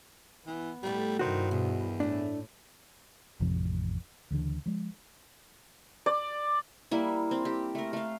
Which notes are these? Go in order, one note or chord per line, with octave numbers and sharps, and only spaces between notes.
E3 B3
A2 G3 A3
G2 C3 D#3 E4 F#4 C5
E2 B2 D#3
A2 A3 D4 E4
A1 F2 C3 F3
D2 C#3 E3 D4
F3 G#3
D5
G3 A#3 E4
C4
G4
A3 A#4
A3 F5